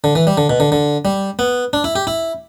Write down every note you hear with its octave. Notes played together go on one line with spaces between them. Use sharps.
D3
E3
G3
D3
B2
D3
D3
G3
B3
D4
E4
G4
E4